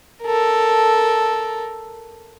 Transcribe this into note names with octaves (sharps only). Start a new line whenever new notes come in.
A4 A#4